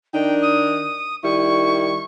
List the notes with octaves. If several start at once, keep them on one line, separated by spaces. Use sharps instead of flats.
D#3 D4 D#4 G5
D#6
D#3 G3 E4 C#6